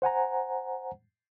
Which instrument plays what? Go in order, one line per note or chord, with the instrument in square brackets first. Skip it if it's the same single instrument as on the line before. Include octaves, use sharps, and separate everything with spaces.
[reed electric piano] C5 F#5 G#5 A#5